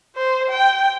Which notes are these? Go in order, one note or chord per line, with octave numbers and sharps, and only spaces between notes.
C5
G5